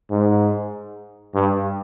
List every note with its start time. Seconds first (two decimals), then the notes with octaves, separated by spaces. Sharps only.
0.11 G#2
1.34 G2